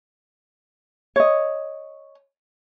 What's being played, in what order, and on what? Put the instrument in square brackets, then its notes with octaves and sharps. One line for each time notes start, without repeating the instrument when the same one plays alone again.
[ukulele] C#5 D#5